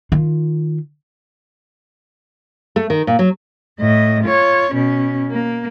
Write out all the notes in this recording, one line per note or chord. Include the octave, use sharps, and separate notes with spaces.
D#3 F4
A3
D#3
A#2
F#3
A2 D#5
F4 C#5
B2 C#4
A#3